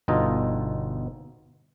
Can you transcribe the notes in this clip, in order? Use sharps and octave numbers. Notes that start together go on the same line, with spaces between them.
G1 B2 D#4 F4 A4 D#5